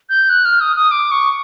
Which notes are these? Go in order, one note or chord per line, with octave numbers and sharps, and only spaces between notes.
G6
F#6
F6
D#6
D#6
D6
C#6